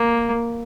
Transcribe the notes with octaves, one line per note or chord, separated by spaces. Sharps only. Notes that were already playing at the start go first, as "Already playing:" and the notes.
Already playing: A#3